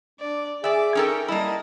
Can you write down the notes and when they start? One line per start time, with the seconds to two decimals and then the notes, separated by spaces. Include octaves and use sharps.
0.20 D4 D5
0.64 G#4 D5 E5 D6
0.95 C#4 D#4 A4 A#4 G5
1.28 G3 A#3 E4 D#5 A5